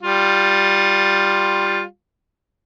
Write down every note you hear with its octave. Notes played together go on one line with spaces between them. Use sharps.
G3 F4